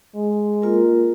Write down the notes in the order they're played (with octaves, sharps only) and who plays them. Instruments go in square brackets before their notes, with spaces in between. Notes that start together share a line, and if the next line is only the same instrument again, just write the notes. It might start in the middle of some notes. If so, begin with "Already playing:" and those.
[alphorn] G#3
[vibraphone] A#3 F4 A#4